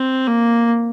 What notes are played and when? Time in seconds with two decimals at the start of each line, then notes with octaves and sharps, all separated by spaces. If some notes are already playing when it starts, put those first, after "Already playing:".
Already playing: C4
0.27 A#3